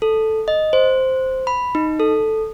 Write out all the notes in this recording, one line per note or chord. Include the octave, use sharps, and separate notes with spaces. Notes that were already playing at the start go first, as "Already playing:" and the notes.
A4
D#5
C5
B5
D#4
A4